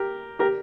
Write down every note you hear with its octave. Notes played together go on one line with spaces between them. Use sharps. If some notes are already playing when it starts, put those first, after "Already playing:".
Already playing: G4 A#4
G4 A#4